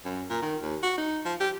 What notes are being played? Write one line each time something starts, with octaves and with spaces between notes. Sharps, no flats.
F#2
A#2
D#3
D#2
F#4
D#4
F3
G4